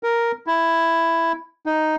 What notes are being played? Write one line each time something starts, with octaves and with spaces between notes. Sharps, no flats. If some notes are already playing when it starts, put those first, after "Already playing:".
A#4
E4
D#4